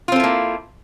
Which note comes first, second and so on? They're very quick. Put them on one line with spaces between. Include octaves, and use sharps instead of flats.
F4 C4 A4 E4 A#3